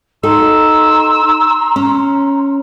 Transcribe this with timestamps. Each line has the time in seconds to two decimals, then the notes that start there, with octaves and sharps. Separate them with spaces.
0.23 D#4 F#4 A4 A#5 C6 E6
1.76 C#4